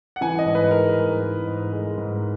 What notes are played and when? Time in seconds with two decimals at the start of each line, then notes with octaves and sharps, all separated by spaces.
0.16 F#5
0.21 E3 G#5
0.39 D#5
0.46 G#2
0.55 B4
0.71 G#3 A#4
0.97 G#2
1.22 E3
1.47 G#2
1.73 G#3
1.98 G#2